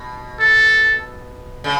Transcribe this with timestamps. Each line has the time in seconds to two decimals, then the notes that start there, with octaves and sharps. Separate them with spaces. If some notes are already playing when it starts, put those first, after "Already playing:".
Already playing: B2
0.40 A4
1.64 C#3